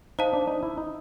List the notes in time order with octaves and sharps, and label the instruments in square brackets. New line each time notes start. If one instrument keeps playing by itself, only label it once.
[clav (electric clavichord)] D#4 [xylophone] C5 F5 A5
[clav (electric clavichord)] D4
D#4
E4
D#4